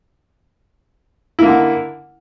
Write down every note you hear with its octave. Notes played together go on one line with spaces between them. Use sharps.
D3 A#3 E4